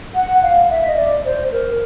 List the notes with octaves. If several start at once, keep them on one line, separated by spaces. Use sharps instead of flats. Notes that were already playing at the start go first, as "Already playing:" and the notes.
F#5
F5
E5
D#5
D5
C5
A#4